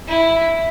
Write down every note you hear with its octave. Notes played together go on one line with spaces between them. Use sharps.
E4